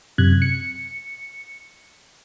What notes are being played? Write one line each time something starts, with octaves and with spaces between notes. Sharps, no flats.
F#2 C3 F#6 G#6
C#7